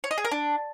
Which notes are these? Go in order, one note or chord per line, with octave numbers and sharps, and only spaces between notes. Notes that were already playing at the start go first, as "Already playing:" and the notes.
C#5
D#5
G#4
A#4
D4